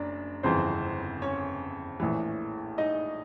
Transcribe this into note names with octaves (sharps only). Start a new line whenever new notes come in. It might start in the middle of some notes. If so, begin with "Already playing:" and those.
Already playing: F#1 F#2 D4 D5
G1 F2 C#3 E3 C4 C5
C#4 C#5
A#1 A2 E3
D#4 D#5